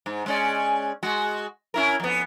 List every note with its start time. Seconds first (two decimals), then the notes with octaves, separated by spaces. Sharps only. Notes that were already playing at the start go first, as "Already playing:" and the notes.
0.06 G#2
0.26 G#3 C#4 D5
1.03 G#3 F#4
1.74 C#4 E4 A#4
2.00 F2 B3